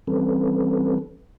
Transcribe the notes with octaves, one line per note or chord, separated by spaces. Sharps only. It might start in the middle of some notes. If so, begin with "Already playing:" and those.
E3 G3 C4 C#4 A4 B4